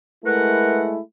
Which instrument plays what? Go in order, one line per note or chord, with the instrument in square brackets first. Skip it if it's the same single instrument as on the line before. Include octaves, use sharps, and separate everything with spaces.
[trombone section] G#3 A3 E4 [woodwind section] A#4 B4 F#5